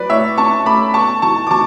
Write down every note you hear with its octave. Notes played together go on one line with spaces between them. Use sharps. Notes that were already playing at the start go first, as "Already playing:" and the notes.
Already playing: F#3 B4 D5
A2 C#5 E5
C#4 A5 C#6
A3 B5 D6
B3 A5 C#6
E3 A5 C#6
D6
E3 A5 C#6